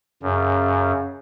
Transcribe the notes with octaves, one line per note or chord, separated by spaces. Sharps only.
F#2 C#3